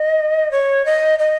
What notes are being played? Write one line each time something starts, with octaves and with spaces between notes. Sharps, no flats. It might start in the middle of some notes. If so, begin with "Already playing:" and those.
Already playing: D#5
C#5
D#5
D#5